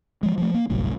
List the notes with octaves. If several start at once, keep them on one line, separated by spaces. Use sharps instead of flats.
F3 G#3
F3 F#3 A3
A#3
G1 C2 F#2 A2